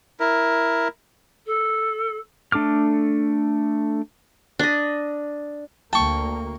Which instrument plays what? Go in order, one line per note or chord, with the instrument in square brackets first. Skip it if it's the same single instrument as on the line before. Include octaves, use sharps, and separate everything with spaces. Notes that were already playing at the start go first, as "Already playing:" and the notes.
[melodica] E4 A#4
[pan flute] A4
[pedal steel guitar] A3 D4 A4 D6 F6
[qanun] D4 D#5
[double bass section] D2 A#3 [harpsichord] G5 C#6 [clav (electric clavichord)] A5